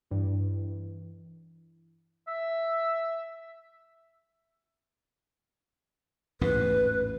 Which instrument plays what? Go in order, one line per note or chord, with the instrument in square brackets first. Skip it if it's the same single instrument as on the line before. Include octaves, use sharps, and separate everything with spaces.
[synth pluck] G2 [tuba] E3
[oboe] E5
[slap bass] A1 E2 G#2 [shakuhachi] B4